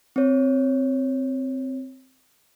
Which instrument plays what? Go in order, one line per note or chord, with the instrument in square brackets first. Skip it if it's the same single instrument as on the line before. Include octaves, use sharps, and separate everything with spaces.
[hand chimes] C4 C#5